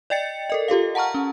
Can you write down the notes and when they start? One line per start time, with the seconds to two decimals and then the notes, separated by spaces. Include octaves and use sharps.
0.10 D5 D#5 G5 A6 C#7
0.50 A4 A#4 D#5
0.68 F4 G4 A4 F5
0.95 F#5 A5 A#5 C#6 F6
1.15 C#4